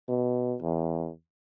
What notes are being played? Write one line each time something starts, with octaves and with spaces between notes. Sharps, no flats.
B2
E2